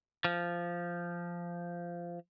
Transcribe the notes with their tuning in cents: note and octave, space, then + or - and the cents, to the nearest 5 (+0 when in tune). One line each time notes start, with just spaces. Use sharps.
F3 -10